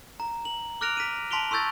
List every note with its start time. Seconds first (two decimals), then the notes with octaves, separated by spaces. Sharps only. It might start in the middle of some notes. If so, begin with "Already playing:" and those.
0.20 A#5
0.45 F#7
0.81 D6 F6 F#6 A#6 D7 F7
0.97 B6 D#7
1.31 A5 C6 B6 D7 F7 G7
1.51 C6 C#6 E6 G6 A6 A#6